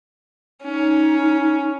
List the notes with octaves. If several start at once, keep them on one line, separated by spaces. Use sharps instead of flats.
C#4 D#4